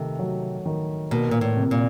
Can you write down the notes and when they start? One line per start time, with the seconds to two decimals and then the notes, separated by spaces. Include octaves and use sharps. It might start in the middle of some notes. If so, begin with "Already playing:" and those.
Already playing: C3 D#3 A3
0.19 F#3
0.65 D#3
1.11 B2 A#3
1.31 A#2
1.41 A2
1.57 C3
1.71 A#2